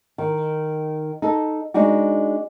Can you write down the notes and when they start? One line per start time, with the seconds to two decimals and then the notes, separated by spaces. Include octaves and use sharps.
0.18 D#3
1.22 D#4 A4
1.74 G#3 D4 D#4 F#4